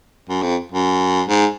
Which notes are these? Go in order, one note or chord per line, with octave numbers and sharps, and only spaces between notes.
F#2
F2
F#2
G#2